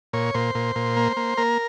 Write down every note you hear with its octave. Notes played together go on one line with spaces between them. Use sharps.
A#2 C#5
A#2 C5
A#2
A#2
A#3
A#3
A#3 A#4